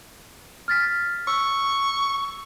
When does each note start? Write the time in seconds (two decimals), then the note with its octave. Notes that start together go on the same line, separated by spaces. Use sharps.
0.68 F6 A6 B6
1.27 C#6 E6